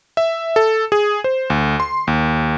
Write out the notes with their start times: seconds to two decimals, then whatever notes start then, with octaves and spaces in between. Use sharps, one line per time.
0.17 E5
0.56 A4
0.92 G#4
1.24 C5
1.50 D2
1.80 C6
2.07 D#2